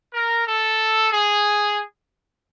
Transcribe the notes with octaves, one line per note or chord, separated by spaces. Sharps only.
A#4
A4
G#4